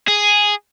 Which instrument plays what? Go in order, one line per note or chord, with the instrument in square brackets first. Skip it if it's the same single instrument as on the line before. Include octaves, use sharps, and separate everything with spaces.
[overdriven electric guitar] G#4